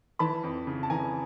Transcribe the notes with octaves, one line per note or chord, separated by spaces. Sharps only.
E3 A5 B5
F2
C#3
A5
E3 G#5 A#5